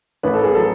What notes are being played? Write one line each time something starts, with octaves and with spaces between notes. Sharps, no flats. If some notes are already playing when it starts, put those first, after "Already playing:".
A1 B4
A4
G#4
F#3 A4